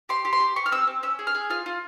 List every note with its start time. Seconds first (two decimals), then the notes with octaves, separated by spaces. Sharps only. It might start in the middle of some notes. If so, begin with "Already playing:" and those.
0.09 G4 C6
0.25 G4
0.33 C6
0.40 G4
0.56 G4 C#6
0.66 F6
0.72 C4 E6
0.87 C4
1.03 C#4 E6
1.19 G#4
1.27 F6
1.35 G#4
1.50 F4 F6
1.66 F4